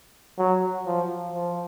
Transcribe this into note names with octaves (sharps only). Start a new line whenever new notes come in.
F#3
F3
F3